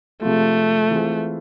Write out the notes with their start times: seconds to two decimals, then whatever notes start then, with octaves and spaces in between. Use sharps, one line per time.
0.22 C3 F3 G#3 A3 C4 F4
0.91 E3 G#3 C4 F4